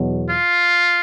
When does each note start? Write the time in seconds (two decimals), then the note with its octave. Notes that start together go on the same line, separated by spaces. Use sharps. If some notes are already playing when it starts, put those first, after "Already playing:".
Already playing: E2 B2 F#3
0.30 F4